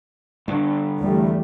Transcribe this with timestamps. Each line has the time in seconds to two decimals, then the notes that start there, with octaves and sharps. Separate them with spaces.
0.48 G2 D3
1.00 E2 G3 A3